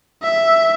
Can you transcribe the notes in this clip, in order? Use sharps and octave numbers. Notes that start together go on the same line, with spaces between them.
E5